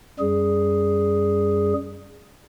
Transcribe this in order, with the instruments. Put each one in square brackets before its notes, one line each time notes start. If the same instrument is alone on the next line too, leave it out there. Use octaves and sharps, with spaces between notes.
[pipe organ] F#2 G3 G#4